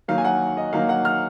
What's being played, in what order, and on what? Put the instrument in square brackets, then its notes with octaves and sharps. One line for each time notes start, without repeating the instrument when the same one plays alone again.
[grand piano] D#3 F#3 A#3 F5
G#5
F#5
D#5
D#3 F#3 A#3 F5
F#5
F6